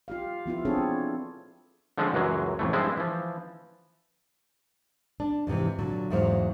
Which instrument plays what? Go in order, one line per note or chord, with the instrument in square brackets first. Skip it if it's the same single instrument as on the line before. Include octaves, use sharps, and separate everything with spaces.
[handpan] F4 G4 F5
F3 B3 E4 F4
C4 D4 G#4 A4 C#5
[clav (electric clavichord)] D3 F3 G#3 A3 C4 C#4
C#2 F#2 E3 F#3 G#3
A1 F2 E3 A3
G2 F3 G3 G#3 C4 E4
E3 F3
[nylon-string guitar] D4
F2 G#2 C3 E3
A#2 D3 F#3
E2 G#2 F#3 C5 F5